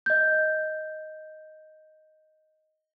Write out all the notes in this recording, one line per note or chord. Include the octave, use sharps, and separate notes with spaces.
D#5 G6